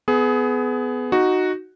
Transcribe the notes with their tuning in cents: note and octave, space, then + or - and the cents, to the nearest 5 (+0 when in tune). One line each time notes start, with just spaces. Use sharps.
B3 +20 G#4 +25
D#4 +0 F#4 +0